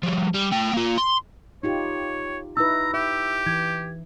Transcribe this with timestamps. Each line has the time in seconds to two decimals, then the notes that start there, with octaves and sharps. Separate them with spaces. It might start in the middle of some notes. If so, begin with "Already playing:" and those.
0.03 F3 G3
0.34 G3
0.51 A3 G5
0.73 A#3 F4
0.98 C6
1.63 D#4 F4 G4 C#5
2.57 D#4 E4 B4 A#5 E6
2.94 G4 E5
3.46 E3 G#6